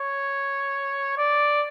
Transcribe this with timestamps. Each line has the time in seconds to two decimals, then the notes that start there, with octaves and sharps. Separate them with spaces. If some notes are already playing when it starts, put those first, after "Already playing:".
Already playing: C#5
1.18 D5